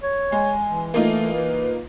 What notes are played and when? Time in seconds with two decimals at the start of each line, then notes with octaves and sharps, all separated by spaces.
0.03 C#5
0.32 G#3 G#5
0.64 E3
0.94 A3 A#3 D#4 F4
1.34 B4